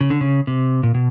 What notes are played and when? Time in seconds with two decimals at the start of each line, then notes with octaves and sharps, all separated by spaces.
0.01 C#3
0.10 D3
0.21 C#3
0.47 C3
0.83 A#2
0.94 B2